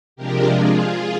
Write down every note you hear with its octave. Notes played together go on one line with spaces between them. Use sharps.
C3 F3 G#3 D4 G4 A#4
F4 G#4
F4 G#4